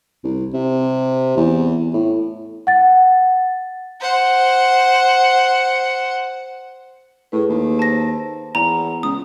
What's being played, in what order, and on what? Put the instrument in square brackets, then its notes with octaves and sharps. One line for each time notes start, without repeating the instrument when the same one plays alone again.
[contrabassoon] C2
C3
E2
A2
[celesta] F#5 A6
[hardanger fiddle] C5 F#5
[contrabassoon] A2 [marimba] G#4 A4 B4
[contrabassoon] D#2
[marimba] C5 [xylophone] A5 A#6
[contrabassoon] E2 [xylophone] A#5
[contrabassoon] C#2 [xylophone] D#6